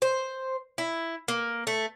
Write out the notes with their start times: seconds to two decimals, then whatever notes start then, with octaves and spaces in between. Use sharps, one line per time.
0.02 C5
0.78 E4
1.28 A#3
1.67 A3